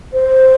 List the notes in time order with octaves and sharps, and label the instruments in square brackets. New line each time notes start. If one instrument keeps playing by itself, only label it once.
[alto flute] C5